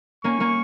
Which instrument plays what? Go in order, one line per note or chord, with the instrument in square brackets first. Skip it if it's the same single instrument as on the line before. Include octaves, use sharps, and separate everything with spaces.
[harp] A#3 C#4 [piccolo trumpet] C#6
[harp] A#3 C#4